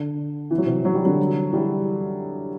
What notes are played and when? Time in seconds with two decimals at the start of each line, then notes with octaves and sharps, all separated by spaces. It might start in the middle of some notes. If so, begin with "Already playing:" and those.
Already playing: D3
0.51 E3
0.58 F#3
0.65 C3 E3
0.85 F#3
0.95 G3
1.05 D3 F#3
1.52 E3 G3